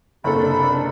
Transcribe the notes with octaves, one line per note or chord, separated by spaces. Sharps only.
F#1 C3 D4 A4 B5